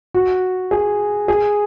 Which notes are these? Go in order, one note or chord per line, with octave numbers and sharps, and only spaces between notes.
F#4
G#4
G#4